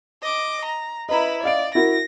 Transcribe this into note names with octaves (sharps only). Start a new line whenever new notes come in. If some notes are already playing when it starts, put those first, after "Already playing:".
D#5 D6
A#5
E4 B4 D#5 A#5
D5 D#5 F5 D7
E4 F#4 A#4 A#6